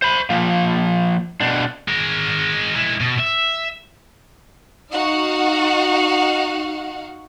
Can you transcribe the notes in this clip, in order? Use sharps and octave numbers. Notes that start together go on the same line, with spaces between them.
C5 B5
F3 A#3
B2 D4
G#3 A#4
G#3 E4
B2
E5
D#4 F#4 F5 F#5